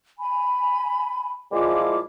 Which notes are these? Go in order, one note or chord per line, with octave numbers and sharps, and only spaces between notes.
G#5 B5
A#2 F3 G#3 E4 F4 D6